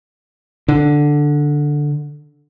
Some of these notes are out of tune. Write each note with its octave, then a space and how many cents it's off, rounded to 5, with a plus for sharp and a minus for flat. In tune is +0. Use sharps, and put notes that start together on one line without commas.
D3 +0